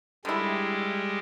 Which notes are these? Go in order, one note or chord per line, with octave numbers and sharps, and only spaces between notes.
D3 G3 G#3 E4